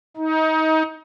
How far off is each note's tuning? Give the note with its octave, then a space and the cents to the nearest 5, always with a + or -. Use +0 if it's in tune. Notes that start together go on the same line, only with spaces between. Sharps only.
D#4 +25